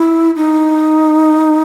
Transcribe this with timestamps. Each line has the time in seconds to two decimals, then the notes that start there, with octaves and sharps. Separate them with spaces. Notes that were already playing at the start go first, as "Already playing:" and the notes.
Already playing: E4
0.36 D#4